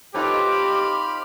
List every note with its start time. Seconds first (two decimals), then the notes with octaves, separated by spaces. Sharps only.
0.14 C4 D#4 F4 G4 A4 B4 C#5 D6
0.51 B5 F6